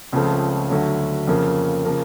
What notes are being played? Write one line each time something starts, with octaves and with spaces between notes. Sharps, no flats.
C#2 C#3 F3 A3 C4
D2 D3 F#3
F2 C#3 F3 A#3
C#3 F3 A#3